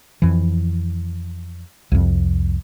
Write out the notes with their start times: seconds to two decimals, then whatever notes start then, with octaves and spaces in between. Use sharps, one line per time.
0.22 F2 E3
1.92 C2 F2